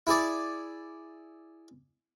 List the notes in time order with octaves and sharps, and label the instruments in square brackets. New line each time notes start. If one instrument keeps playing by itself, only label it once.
[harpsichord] E4 G#4 D5